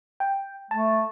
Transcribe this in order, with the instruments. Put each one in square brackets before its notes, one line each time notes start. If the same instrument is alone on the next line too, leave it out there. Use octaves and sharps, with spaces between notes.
[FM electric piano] G5
[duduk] A3 [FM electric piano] A5